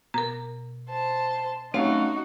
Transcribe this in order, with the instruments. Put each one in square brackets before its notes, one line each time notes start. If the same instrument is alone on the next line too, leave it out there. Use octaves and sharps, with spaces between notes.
[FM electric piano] B2 [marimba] A#4 A#5
[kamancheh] C5 A5
[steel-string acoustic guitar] F#2 A3 F5 [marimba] C4 [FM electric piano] C#4 [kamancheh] D#4 F#4